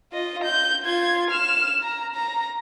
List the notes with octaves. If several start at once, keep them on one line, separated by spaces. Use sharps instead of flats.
F4 D#5
G6
F4 G#6
F6 E7
A#5
A#5